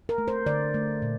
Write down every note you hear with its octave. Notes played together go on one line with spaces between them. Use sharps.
A#4
A3
C5
D3 D5
A3
A#2